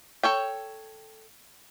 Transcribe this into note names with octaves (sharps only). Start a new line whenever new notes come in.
A4 C#5 G5